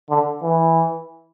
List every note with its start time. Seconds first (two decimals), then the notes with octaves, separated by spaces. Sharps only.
0.10 D3
0.42 E3